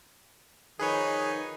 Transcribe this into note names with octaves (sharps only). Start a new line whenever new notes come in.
D#3 F3 D#4 G#4 B4 C#5